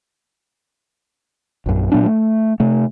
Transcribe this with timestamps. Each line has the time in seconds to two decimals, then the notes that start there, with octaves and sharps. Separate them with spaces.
1.66 A#1 F#2
1.92 A#2 F#3 B3 D4
2.06 A3
2.60 C3 A3